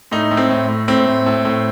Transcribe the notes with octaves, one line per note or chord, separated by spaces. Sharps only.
A2 D#4
A2
C4
A2
A2
A2 C4
A2
A2
A2